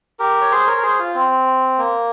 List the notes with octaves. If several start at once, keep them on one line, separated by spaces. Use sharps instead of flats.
G4 A#4
C#5
G#4 C5
A#4 C#5
A#4
G#4 C5
F4
C4
A#3